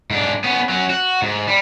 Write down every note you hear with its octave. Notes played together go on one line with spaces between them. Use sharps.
G#2 D4
B3 C#4
F#3 C#4
F#4
G#2
G3